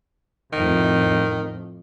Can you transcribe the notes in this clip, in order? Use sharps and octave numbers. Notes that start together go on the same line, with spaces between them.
F2 A2 D#3